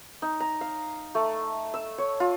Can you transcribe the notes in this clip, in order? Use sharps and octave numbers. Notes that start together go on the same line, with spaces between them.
D#4
A#5
F5
A3
E6
C#5
F4